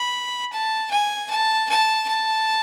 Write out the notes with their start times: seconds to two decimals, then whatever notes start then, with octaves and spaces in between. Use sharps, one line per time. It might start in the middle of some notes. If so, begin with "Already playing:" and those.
Already playing: B5
0.52 A5
0.90 G#5
1.30 A5
1.69 A5
2.08 A5